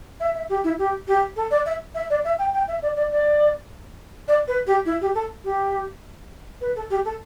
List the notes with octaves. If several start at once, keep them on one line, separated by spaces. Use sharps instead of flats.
E5
E5
G4
E4
G4
G4
A4
D5
E5
E5
D5
E5
G5
G5
E5
D5
D5
D5
D5
B4
G4
E4
G4
A4
G4
B4
A4
G4
A4